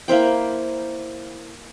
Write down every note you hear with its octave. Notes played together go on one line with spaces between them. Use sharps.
A#3 E4 C5 G5